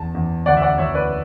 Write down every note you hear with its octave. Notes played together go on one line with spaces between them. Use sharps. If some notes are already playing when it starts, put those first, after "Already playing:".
Already playing: E2 A5
E2
D2 D5 F#5
E5
D5 F#5
D2 C#5 E5
B4 D5